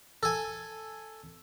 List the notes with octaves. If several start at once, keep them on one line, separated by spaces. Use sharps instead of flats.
A4 G#5